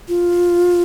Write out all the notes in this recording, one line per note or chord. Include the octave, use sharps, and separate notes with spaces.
F4